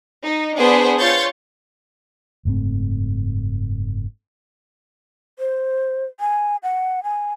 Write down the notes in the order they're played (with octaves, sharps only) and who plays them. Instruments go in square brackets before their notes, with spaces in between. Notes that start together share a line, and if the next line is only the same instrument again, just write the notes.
[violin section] D#4
B3 D4 G#4 C5
F4 C#5 C6 C#6 G6 A6
[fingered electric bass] F#1 G#2 A3 C4
[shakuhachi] C5
G#5
F#5
G#5